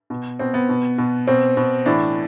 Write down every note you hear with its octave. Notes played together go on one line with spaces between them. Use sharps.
B2
B2 C4
B3
B2
B2
B2 C4
B2
A2 E3 D4